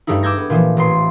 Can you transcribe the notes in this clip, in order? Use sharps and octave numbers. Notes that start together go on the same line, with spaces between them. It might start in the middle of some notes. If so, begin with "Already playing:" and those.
G2 G3 A3 D#4 E4
D6 E6 G6 G#6 A#6
B3
A#2 E3 F3
A1 C6